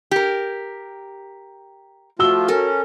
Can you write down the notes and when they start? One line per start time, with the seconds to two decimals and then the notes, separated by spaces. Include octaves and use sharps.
0.11 G4 A#4
2.19 F3 A3 F4 F#4 E6 G7
2.48 C#4 A4 A#4